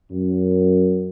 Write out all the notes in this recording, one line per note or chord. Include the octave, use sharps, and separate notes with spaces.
F#2